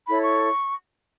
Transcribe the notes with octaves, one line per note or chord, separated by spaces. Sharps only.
E4 A4 C#5 B5
C#6